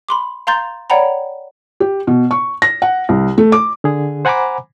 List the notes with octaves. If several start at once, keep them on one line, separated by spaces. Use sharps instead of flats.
B5 C6 D6
F5 A#5 C6 G6 A6
C#5 D5 F#5 G5 A#5 B5
G4
B2
C#6
A#6
F#5
C2
A3
D6
D3 G#4
C5 F#5 G#5 A#5 B5 D6